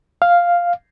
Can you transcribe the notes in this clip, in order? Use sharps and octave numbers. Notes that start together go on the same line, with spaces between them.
F5